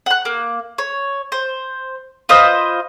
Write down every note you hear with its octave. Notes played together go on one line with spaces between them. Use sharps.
F#5 F#6
A#3
C#5
C5
F4 B4 C5 D#5